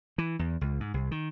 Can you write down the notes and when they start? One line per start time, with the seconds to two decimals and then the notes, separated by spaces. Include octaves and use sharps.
0.18 E3
0.39 E2
0.61 C#2
0.80 G#2
0.94 C2
1.11 D#3